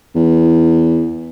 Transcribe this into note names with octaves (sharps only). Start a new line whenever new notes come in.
E2